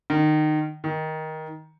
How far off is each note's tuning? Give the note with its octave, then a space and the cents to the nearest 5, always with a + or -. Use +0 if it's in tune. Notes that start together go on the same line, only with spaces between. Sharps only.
D#3 -25
D#3 +15